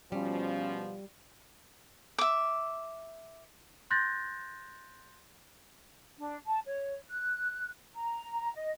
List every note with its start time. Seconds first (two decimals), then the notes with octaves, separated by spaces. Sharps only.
0.12 B2 F3 G3 C#4
2.18 E5 D6
3.90 C6 F#6 G6 A6 A#6
6.19 D4
6.46 A5
6.66 C#5
7.10 F#6
7.95 A#5
8.55 D#5